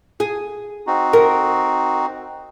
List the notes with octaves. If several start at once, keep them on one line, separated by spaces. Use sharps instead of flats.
G#4
C4 D#4 F#4
A#4